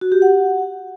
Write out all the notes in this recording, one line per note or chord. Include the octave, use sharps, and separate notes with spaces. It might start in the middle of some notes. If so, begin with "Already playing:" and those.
F#4
G4
F#5